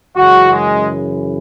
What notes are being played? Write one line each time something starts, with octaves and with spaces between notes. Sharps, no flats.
F#2 C#3 E3 G#3 F#4
G#3